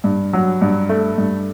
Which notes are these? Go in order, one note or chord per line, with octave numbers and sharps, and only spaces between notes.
G2
F#3
G2
A3
G2